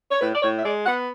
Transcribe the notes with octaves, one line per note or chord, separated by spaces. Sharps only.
C#5
A2 B4
D5
A2 C#5
E5
G#3 D5
B3 F#5